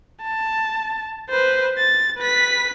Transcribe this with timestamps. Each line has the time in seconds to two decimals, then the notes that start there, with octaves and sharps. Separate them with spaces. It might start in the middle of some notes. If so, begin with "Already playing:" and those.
0.23 A5
1.30 B4 C5
1.78 A6
2.18 B4 B6